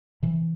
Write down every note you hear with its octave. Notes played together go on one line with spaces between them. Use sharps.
C3 E3